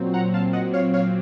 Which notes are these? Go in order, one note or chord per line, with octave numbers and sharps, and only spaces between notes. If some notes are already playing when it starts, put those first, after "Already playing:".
Already playing: A#2 F#3 C4
F#5 A#5
F5 A5
D#5 F#5
C#5 F5
C#5 F5